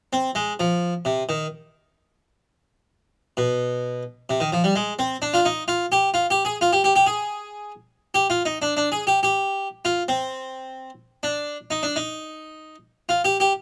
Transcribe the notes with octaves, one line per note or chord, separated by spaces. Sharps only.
C4
G#3
F3
C3
D#3
B2
C3
D#3
F3
G3
G#3
C4
D4
F4
D#4
F4
G4
F4
G4
G#4
F4
G4
G4
G4
G#4
G4
F4
D#4
D4
D4
G#4
G4
G4
F4
C4
D4
D#4
D4
D#4
F4
G4
G4